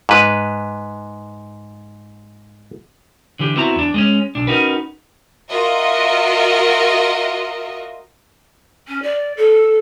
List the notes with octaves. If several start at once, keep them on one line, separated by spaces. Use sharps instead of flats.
G#2 B4
D3 E3 G4
B3 C4 E4 F#4 A#5
E2 D4
G#3 C4 C#4
B1 D4
C#4 D#4 F#4 A#4 B4
F4 F#4 A#4 D#5 E5
C#4
D5
A4